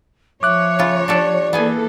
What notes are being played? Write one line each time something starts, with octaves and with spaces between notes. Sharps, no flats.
F3 C#5 E5 D6 F#6
C#3 F4
D4 G4 A4 D5
E3 A#3 B3 G#4 A4 G#5